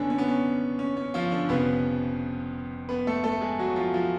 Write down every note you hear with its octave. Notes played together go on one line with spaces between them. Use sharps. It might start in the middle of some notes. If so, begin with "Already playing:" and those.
Already playing: F#1 F#2 D3 G#3 B3 C#4 D4 G#4
C#4
B3
C#4
C#4
C#4
F3 F4
D3 D4
F1 F2 C#3 F3 B3 B4
B3 B4
A3 A4
A3 A4
G#3 G#4
F#3 F#4
F3 F4
F3 F4